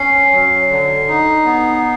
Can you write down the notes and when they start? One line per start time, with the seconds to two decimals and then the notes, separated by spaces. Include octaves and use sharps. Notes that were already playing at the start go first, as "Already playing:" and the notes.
Already playing: C#4 C7
0.32 F#3
0.69 D3
1.08 D#4
1.45 B3